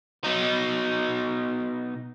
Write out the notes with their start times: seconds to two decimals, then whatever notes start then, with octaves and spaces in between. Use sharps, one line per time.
0.24 B2 D#4